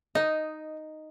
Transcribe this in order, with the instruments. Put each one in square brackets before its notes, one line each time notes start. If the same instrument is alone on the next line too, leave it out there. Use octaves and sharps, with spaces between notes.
[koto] D#4 [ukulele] D#5